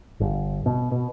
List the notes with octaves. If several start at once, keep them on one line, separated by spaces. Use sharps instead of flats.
G1
B2
B2